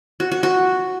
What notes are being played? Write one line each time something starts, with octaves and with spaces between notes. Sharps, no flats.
F#4
F#4
F#4